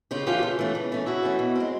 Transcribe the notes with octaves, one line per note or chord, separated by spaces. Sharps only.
C#3 F4 G4
E3 A3 C#4 F4 G4
C#3
E3 A3 C#4
C#3
E3 A3 C#4
C#3 E4 F#4
E3 A3 C#4
B2
G#3 C4